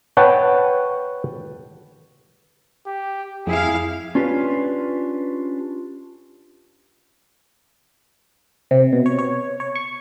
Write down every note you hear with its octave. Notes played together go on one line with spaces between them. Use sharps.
B4 C#5 F#5 G5 A5
G4
F2 E4 G#4 F5
C#4 D4 F4 G4 B4
C3
B2
C#5
C#5
C#5
C#6